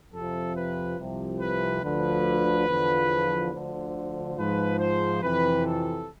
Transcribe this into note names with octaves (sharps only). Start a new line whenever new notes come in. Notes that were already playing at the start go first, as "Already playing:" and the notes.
F2 C3 F3 A4
B4
C2 C3 F3
B4
D2 D3 F3 B4
E2 D3 F3
D2 D3 F3 C5
G#2 F3 B4
C5
F2 C3 E3 B4
A4